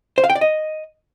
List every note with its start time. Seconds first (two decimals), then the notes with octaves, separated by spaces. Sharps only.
0.18 C5
0.24 F5
0.30 G5
0.35 D5
0.41 D#5